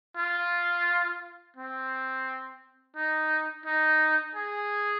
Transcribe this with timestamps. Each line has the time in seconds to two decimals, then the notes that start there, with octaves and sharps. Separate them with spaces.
0.17 F4
1.57 C4
2.96 D#4
3.66 D#4
4.35 G#4